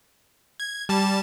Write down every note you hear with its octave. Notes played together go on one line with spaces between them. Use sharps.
G#6
G3 A5 A6